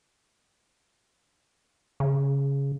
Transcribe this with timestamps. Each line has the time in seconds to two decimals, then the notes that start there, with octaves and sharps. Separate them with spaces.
2.00 C#3